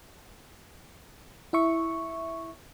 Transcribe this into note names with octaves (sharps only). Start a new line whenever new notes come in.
E4 E5 C#6